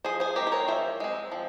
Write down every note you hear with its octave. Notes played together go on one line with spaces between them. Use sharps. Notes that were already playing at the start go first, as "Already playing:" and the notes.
F3 G#4 C5
G#4 C5
G#3 C4 G4 A#4
C5
A#4 C#5
F3 C5 E5
G#3 C4
F3